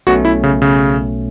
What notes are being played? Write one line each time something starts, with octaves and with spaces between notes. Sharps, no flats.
B1 B2 A3 C#4 F#4
E4
C#3
C#3